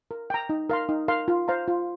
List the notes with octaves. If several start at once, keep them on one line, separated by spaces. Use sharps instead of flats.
A#4
G5 A#5
D#4
A#4 F5 C6
D#4
A#4 F5 C6
F4
C5 F5 A#5
F4